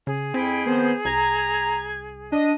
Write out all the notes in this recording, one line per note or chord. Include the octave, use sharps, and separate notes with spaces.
C#3 G#4
F2 C4 E4 G5
D#3 F3 B3 C5
C2 A#5 G#6
D4 D#5